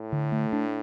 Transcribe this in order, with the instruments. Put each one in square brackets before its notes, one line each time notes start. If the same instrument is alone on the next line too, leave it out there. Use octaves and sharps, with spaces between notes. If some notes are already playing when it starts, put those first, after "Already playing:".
Already playing: [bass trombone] A2
[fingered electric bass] D3
A3
D4